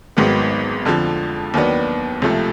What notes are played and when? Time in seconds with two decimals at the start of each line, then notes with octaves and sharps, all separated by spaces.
0.17 G#1 G#2 D#3 F#3 B3
0.85 F2 D3 F3
1.54 D#2 D#3 F#3 B3 D4
2.22 C#2 C3 F3 A3